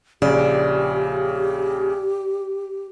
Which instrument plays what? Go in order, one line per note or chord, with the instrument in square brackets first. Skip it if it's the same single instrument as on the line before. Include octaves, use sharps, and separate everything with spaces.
[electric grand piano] A#1 C#3 [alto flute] G4 [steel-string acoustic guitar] D5